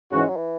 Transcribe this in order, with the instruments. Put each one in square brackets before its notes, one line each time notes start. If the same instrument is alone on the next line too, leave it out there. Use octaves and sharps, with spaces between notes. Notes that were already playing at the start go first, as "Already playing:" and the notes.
[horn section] G#2 E3 C#4 F#4 [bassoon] C#3
[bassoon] G#3
F#3
E3